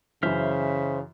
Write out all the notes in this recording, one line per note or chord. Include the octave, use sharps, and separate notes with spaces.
F#2 C#3 E3 C5 E5 F6